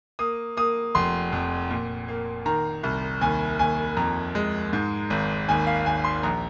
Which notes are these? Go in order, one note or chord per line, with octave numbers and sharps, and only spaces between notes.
A#3 D#6
A#3 D#6
F1 C6
F2
A#2
A#3
D#3 A#5
C2
D#2 G#5
D#2 G#5
F2 A#5
G#3
G#2
G#1
D#2 G#5
F5
D#2 G#5
C6
A#1 A#5